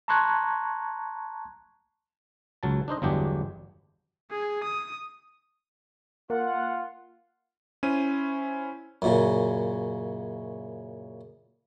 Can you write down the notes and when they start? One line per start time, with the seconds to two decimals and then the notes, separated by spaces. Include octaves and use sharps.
0.08 A5 A#5 C6 C#6 F#6 G#6
2.63 C#2 F#3 A5
2.88 D4 D#4 C5 D#5
3.02 G1 E2 F#3 G#3 D4 G4
4.31 G#4
4.64 D#6
6.30 A#3 F4 F#5
7.83 C#4 E4 C5 D#7
9.02 F#2 A#2 C#3